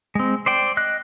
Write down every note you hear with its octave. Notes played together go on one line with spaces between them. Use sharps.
G#3 C4
C5 D5 G5
D#5 F#6